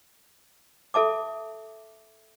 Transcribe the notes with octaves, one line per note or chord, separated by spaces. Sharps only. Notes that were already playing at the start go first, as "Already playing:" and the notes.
A4 E5 A5 D6